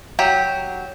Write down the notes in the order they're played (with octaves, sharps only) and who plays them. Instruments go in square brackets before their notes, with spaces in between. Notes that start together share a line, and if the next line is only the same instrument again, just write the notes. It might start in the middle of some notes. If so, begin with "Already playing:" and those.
[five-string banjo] F#3 G4